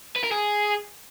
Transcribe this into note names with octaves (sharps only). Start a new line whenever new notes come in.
B4
A#4
G#4